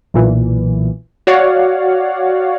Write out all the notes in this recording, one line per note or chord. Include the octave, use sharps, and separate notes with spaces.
B1 A#2 E3
F#4 C#5 D5 F5 F#5